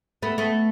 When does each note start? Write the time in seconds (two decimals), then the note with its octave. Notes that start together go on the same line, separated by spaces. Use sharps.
0.22 A3 B3
0.38 A3 B3